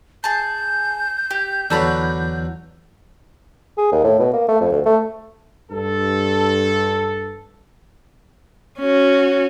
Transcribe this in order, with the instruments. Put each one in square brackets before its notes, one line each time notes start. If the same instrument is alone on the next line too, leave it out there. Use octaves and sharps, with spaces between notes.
[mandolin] G#4 A5 [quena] G6
[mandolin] G4
[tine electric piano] E2 E3 [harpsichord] D3 F#3 D4 [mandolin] F#4 A5 B5
[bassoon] G#4
D#2
A2
B2
A#3
A3
F2
D2
A3
[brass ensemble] G2 A4
[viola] C#4 F#4